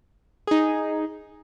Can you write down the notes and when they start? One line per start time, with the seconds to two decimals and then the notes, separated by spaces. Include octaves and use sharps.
0.47 D#4 G#4